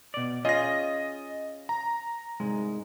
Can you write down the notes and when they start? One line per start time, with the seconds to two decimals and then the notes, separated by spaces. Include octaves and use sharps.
0.14 B2 D5
0.45 C#4 F4 G#4 D#5 A#6
1.69 A#5
2.40 C2 G#2 G#3